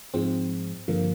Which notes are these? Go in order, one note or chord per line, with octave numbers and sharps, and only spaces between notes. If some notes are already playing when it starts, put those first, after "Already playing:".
G#2 F3 G#3 C4
G2 D3 F3 A#3